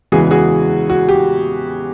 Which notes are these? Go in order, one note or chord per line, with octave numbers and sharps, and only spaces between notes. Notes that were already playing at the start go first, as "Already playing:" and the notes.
E2 C#3 E3 G#3 F#4 G#4
F#4 G#4
F#4
G4